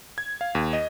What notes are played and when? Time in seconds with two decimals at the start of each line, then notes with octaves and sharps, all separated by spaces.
0.18 G#6
0.41 F5
0.55 D#2
0.73 D#5